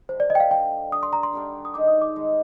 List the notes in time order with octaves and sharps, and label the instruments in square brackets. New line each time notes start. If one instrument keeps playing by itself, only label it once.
[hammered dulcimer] D3 G3 D4 [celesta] C5
[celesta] D5
D#5
G5
F5
[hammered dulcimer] D3 G3 D4 [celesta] G5
[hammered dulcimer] D3 G3 D4 [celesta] D#6
[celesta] C6
A#5
C6
[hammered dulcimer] D3 G3 D4
[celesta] D#6
[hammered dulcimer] D#3 G#3 D#4 [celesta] D6
[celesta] D#6
D6
[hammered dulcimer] D#3 G#3 D#4